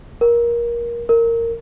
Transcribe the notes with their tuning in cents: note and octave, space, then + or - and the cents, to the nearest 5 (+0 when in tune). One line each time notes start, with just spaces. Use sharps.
A#4 +20
A#4 -15